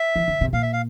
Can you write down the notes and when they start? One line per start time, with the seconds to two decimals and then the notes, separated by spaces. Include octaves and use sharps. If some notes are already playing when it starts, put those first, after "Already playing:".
Already playing: E5
0.16 E3
0.28 D3
0.41 C3
0.53 A#2 F5
0.63 E5
0.73 F5